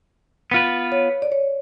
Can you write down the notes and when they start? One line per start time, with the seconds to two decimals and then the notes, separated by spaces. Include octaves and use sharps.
0.51 B3 F4 B4
0.92 C#5
1.22 D5
1.32 C#5